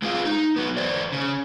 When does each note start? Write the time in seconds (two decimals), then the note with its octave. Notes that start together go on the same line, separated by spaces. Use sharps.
0.02 G#3 C4 F4 G#4 C5 F5
0.25 D#4
0.56 F#3 B3
0.77 E2 C5 D5
1.12 C#3 C#4